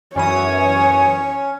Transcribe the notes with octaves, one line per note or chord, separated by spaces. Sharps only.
F#2 E3 C#4 C#5 G#5 D#6